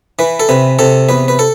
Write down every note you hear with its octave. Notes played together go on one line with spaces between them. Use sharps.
E3 B4
A4
C3 B4
C3 A4
E2 B4
B4
A4